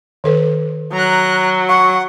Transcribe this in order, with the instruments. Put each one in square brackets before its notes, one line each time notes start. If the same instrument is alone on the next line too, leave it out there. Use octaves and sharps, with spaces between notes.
[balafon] D#3 A4 B4
[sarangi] F#3 [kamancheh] A#5 F#6
[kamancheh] F#5 [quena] C#6